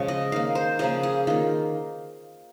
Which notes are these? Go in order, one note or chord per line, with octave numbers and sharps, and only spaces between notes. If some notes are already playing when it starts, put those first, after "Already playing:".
Already playing: C#3 F3 G#3 C#5
D#5
D#3 A#3 F5
C5
C#3 F3 A#3 G#4
G#4
D#3 A#3 F4